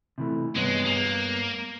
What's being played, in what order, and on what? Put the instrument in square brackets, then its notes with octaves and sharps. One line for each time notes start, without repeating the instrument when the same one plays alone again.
[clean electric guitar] C3 E3 A3
[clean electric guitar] G2 B3 C#5 [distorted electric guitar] G#3
[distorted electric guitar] A#3